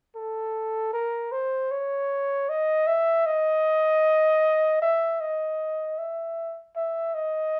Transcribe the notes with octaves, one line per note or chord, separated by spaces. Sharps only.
A4
A#4
C5
C#5
D#5
E5
D#5
E5
D#5
E5
E5
D#5